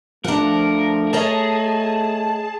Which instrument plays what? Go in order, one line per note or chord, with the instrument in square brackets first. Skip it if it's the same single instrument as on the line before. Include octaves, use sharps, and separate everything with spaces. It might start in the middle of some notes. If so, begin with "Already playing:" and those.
[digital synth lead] F3 [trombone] A3 [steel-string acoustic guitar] D4 F#5 [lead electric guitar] A#4 A#5
[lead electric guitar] G#4 [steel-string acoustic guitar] C#5 D#5 A#5 [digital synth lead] A5